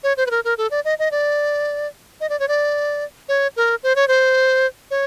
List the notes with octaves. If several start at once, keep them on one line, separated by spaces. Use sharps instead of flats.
C#5
C5
B4
A#4
A#4
A4
D5
D#5
D#5
D5
D#5
D5
C#5
D5
C#5
A#4
C5
C#5
C5
C#5